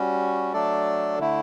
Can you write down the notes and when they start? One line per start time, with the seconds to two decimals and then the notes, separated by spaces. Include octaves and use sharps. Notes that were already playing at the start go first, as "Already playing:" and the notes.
Already playing: G3 C#4 F#4
0.53 F#3 A3 D4 A4 D5
1.19 D3 A3 E4